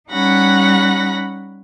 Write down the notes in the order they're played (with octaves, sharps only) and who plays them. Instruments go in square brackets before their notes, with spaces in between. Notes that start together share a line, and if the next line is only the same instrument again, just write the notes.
[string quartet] G3 C#4 D#4 F#5 B5 A#6